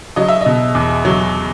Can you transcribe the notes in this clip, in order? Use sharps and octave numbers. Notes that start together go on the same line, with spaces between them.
F#3 D#5
E5
B2 D#5
E2
F#3